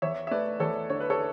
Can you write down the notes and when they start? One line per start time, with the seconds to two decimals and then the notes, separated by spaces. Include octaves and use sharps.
0.02 E2 C#5 E5
0.27 E5
0.31 A3 B4 D5
0.60 E2 A4 C#5
0.89 D3 C#5
1.00 B4
1.10 A4 C#5